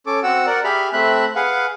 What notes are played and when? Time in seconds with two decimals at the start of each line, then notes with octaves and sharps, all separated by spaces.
0.07 C#4 A4 D6
0.23 C4 F#4 F#5 E6
0.46 A#4 D5 F#5
0.64 G4 G#4 E5 B5 F6
0.93 A3 C4 E5 B5 F#6
1.36 G#4 B4 F5 F#5